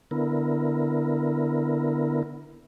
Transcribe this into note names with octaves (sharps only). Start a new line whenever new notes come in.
D3 B3 E4 A#4